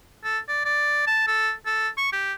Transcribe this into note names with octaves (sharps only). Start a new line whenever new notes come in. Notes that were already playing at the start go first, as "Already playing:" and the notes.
A4
D5
D5
A5
A4
A4
C#6
G4